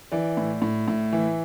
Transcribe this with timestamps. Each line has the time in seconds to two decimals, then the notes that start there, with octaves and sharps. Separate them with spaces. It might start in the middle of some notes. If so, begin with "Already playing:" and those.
0.12 E3 D5
0.37 A2
0.62 A2
0.88 A2
1.13 E3